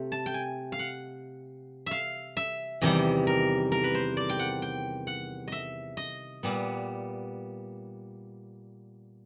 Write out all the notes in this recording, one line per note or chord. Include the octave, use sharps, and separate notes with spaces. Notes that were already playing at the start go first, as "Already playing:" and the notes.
Already playing: C3 A3 C4
A5
G5
G#5
F5
F#5
E5 F5
E5
E2 C3 D#3 G3 D#5
A#4
A#4
B4
C5
D5
G5
F#5
G5
F#5
D#5 E5
D#5
A#2 G3 B3